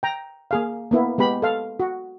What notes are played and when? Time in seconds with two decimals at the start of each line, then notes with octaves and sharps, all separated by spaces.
0.03 G5 A#5
0.51 A#3 G#4 F5
0.91 A#3 B3 E4
1.18 G#3 B3 G4 B5
1.42 A4 F5
1.80 F#4